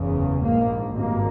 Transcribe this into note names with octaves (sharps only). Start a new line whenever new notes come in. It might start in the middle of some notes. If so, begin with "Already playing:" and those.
Already playing: F#1 E2 C#3
A#1 G#2 A#3
G#1 G2 A#3